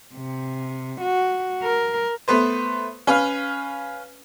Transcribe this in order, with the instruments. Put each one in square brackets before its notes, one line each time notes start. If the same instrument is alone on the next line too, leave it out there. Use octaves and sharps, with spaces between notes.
[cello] C3
F#4
A#4
[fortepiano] A3 B3 B4 C5
C#4 B4 F5